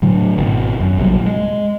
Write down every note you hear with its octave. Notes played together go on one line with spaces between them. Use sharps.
A2 D3 F#3 A3
G#1 B2
F#2
A#1 C3 F#3 G3
G#3